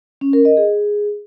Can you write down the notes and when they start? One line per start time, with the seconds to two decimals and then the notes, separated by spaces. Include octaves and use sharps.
0.21 C#4
0.33 A#4
0.45 D#5
0.57 G#4